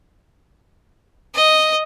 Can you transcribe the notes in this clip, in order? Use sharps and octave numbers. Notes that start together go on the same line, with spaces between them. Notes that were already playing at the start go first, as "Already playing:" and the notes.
D#5